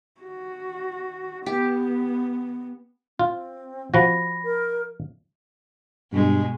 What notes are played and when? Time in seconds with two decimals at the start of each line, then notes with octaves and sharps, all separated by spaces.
0.21 F#4
1.46 B3 G4
3.19 C4 F4
3.94 F3 F#4 B5 A#6
4.44 A#4
6.12 G2 B2 G#3